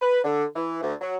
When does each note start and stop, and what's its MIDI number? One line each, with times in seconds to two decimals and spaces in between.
0.01 0.19 71
0.24 0.43 50
0.55 0.80 52
0.81 0.93 38
1.00 1.15 54